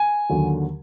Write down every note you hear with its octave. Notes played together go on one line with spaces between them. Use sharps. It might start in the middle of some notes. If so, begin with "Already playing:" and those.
Already playing: G#5
D#2 D3 F#3